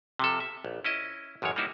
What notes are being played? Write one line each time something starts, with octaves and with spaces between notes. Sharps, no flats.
C3 F3 A4
E5
A#1
C#4 E4 D#5
A1 F#2 D#3 E3 C#5
G3 A#3 D#4 E4 F#4